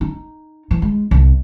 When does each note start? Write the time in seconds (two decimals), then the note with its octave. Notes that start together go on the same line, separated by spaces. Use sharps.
0.01 D#4
0.71 E3
0.82 G#3
1.11 C2